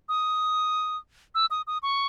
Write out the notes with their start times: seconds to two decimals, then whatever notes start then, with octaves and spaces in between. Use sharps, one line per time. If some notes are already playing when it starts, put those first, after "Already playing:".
0.09 D#6
1.35 E6
1.51 D#6
1.67 D#6
1.83 C#6